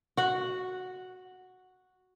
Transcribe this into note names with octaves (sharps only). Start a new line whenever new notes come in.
F#4 F#5